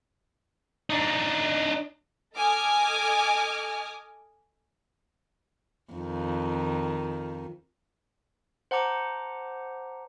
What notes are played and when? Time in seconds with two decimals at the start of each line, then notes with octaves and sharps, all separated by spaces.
0.90 D4 D#4
2.36 A4 D#5 G#5 D6 D#6 F6
5.93 F2 D#3
8.71 C5 F#5 A5 A#5 D6